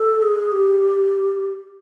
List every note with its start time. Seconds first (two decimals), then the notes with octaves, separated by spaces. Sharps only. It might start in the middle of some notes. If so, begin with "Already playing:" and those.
Already playing: A4
0.22 G#4
0.52 G4